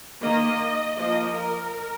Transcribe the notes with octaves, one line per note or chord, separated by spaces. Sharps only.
D#3 A#3 D#5
F3 A#3 D#5
A#4